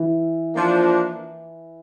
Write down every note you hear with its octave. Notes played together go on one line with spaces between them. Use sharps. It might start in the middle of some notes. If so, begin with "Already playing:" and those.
Already playing: E3
F3 A#3 D4